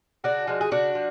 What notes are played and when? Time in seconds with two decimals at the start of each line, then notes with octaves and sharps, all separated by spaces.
0.24 C#3 D4 F#4
0.47 F3 G#3
0.61 G#4
0.71 C#3 D4 F#4
0.95 F3